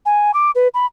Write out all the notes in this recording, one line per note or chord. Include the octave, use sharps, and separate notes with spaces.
G#5
D6
B4
B5